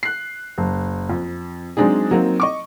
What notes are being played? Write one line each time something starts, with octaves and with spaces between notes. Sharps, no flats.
F#6 C7
F#1
F2
F#3 G#3 C4 D4 D#4 G#4
F#3 A#3 C4 D#4
D#5 C#6 D6